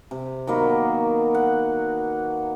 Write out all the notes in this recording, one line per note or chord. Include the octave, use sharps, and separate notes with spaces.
C3
D#3 F#3 A#3 B3
F#5